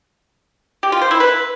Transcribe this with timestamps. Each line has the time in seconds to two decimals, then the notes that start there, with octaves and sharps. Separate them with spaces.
0.83 G4
0.92 F4
1.02 C5
1.11 E4
1.20 B4